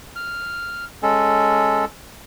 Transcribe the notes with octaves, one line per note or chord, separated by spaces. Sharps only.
F6
G#3 C#4 A4